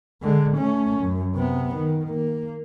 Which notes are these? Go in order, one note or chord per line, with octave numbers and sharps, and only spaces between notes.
D3 G#3
A3 C#4
F#2
C3 B3
D#3
A#3